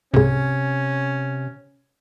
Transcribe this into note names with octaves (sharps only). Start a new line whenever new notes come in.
C2 G#2 C3 C#4